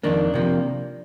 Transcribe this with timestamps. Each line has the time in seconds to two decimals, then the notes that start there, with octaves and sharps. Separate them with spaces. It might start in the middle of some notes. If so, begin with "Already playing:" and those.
0.03 F2 D#3 A#3 D4
0.34 C3 F3 A#3